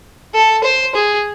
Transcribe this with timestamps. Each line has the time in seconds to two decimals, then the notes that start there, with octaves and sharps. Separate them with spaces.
0.35 A4
0.64 C5
0.95 G#4